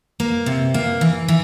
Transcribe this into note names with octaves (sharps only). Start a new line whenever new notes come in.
A#3
C3
A#3
E3
E3